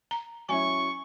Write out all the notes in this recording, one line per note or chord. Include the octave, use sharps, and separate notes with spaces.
A#5
F#3 C#4 E4 G#5 C#6